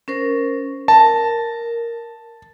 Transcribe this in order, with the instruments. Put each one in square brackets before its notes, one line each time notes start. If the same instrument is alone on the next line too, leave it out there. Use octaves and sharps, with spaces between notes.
[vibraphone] C#4 A#4 C5
[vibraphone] A#4 [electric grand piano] A5